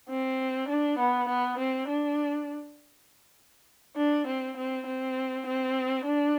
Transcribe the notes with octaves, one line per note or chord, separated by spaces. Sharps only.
C4
D4
B3
B3
C4
D4
D4
C4
C4
C4
C4
D4